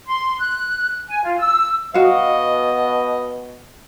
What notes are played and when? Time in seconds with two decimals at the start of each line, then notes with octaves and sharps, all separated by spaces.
0.07 C6
0.39 F#6
1.08 G#5
1.24 F4
1.39 E6
1.94 B2 F#4 D#5 F5